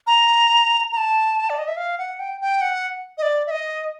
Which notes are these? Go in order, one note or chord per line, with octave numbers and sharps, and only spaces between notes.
A#5
A#5
A5
D5
D#5
E5
F5
F#5
G5
G5
F#5
D#5
D5
E5
D#5